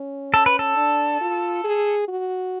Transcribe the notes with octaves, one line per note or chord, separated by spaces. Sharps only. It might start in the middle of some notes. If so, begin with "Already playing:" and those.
Already playing: C#4
A4
B4
A4
D4
F4
G#4
F#4